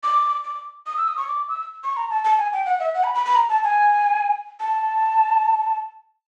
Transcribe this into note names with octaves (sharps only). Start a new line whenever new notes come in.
D6
D6
D#6
E6
D#6
C#6
D6
E6
C#6
A#5
A5
A5
G#5
G5
F#5
E5
F#5
B5
B5
B5
A#5
A5
G#5
A5